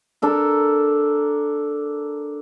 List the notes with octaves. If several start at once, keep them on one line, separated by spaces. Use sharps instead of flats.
D4 A4 A#4